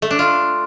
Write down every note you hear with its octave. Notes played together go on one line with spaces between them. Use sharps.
A3
D4
F4